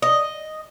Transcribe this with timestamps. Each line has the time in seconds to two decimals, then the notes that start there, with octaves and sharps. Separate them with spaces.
0.02 D#5